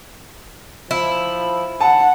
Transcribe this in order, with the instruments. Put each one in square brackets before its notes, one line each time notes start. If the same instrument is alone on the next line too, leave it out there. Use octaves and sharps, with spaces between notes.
[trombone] F3 [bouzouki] E4
[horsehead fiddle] F#5 [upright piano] A5